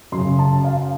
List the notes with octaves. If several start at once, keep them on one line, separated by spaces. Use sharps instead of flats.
F#2 C#3 C6
A5
F5